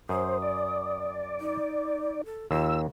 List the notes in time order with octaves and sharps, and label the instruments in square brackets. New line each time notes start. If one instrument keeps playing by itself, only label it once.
[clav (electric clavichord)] F#2 [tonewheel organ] C5 [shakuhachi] D#6
[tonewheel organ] D5
[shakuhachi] D#4
A4
[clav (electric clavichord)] D#2 [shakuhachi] F4 [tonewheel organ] E6